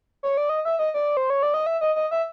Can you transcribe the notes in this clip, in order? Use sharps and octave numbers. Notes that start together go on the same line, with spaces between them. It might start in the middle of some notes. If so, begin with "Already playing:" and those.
C#5
D5
D#5
E5
D#5
D5
C5
C#5
D5
D#5
E5
D#5
D#5
E5